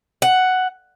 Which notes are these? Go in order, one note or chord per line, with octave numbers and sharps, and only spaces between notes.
F#5